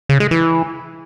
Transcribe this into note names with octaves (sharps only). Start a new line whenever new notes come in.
C#3
G#3
E3